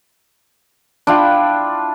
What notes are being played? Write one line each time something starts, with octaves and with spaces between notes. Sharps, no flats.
D4 E4 F4 G5